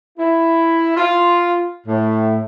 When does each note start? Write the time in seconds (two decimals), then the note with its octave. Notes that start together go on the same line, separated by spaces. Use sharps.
0.18 E4
0.96 F4
1.87 A2